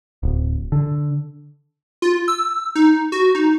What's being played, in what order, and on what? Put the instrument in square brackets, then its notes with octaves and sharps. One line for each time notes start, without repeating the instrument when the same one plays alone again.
[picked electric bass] D1
D3
[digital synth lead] F4
E6
D#4
F#4
D#4